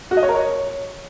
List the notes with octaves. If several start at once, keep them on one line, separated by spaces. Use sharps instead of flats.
F#4
D#5
C#5
A#4
C#5